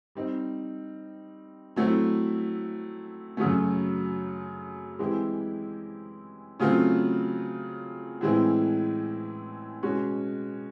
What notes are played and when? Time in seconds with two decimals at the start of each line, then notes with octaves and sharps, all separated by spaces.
0.15 G3 C4 D#4
1.76 F#3 A3 C4 E4
3.37 F#2 C#3 F#3 A3
4.99 E3 G#3 C4 E4 G4
6.60 C#3 F#3 A3 C4 F4
8.21 A2 E3 G#3 C4 E4
9.83 B2 G#3 C#4 F#4